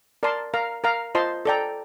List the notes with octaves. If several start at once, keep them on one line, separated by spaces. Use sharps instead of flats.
A#4 D5 A5 C6
A#4 F5 A#5
A#4 F5 A#5
F4 C5 D#5 A5 C6
A4 D5 G5 A#5